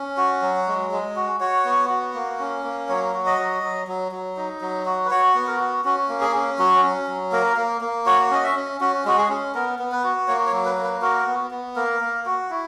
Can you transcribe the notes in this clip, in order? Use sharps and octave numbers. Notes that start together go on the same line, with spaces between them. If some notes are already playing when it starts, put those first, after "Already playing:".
Already playing: C#4
F#4
F#3
G#3
G#3
F#4
F#4 C#5
B3
F#4
A#3
C#4
A#3
F#3 C#5
F#4
D#5
F#3
F#3
F#3
F#3
D#4
F#3
F#4
B4
F#4 C#5
B3
A#4
F#4
C#4 F#4
A#3
G#4
C#4
F#3 F#4
C#4
F#3
A#3 A#4
A#3
A#3
F#4 C#5
C#4 D#5
E5
C#4
C#4 F#4
G#3 F#4
G#4
C#4
B3 A#4
B3
B4
F#4
A#3 C#5
C#5
F#3
B4
A#3
B4
F#4 A#4
B3
B3
A#3 A#4
A#3
F#4
E4